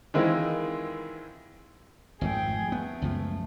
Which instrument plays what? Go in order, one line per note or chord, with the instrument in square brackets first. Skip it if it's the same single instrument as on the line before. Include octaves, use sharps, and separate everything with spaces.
[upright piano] D#3 E3 G#3 C4 E4 F4
[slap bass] G#1 F2 A3 [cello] G#4 G5
[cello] A3 [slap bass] B3
[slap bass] C#2 F#2 F3